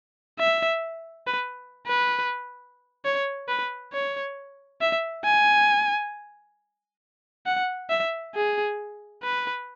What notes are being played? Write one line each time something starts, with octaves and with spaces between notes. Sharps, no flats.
E5
B4
B4
C#5
B4
C#5
E5
G#5
F#5
E5
G#4
B4